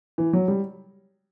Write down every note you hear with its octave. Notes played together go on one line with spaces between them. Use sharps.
E3
F#3
G3